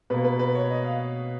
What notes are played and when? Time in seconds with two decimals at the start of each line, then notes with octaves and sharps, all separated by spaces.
0.10 B2 A#3 B4
0.24 B4
0.39 B4
0.55 C#5
0.70 D#5
0.84 F5